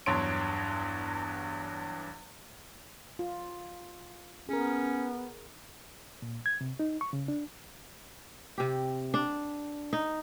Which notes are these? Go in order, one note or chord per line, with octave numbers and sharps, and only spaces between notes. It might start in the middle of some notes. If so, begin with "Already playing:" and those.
E2 G2 F#3 C#5 C6 D7
F4
B3 C#4 G#4 A#4
A#2
G#6
C3
D#4
C#6
C#3
D4
C3 G4
D4
D#4